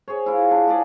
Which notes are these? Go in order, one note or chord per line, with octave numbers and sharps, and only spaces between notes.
G#4 C5 C#5
E4 F4
D4
G4 G#4 D5